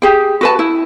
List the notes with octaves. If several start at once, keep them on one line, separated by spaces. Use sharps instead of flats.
G4 G#4 G5
F#4 B4 A5
E4